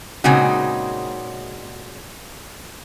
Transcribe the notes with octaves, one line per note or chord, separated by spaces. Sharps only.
A#2 C#3 G#3 C4 D#4 F#4